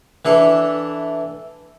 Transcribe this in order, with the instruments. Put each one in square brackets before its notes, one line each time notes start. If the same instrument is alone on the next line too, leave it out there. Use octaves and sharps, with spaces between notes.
[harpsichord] E3 D4 A4